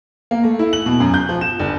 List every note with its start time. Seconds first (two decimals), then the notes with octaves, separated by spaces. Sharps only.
0.31 A#3
0.44 A3
0.59 E4
0.73 F#7
0.86 B2
1.00 F#2
1.14 G6
1.29 F3
1.41 E7
1.59 G1